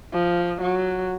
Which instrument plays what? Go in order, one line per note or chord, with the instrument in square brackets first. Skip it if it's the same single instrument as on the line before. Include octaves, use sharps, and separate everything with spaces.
[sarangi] F3
F#3